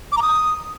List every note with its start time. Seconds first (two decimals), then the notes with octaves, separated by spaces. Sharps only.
0.12 D6
0.17 A#5
0.22 D#6